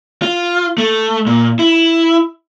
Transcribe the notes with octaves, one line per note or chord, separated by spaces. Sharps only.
F4
A3
A#2
E4